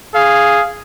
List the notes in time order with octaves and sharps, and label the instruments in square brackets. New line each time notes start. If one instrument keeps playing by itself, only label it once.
[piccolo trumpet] G#4 [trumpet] F5